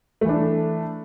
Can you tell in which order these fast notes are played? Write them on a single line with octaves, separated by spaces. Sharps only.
A3 E3 D4